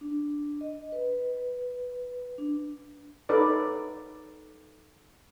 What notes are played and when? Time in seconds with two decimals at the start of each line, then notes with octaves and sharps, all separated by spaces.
0.01 D4
0.61 D#5
0.92 B4
2.38 D4
3.29 D#4 A4 B4 C#5 D5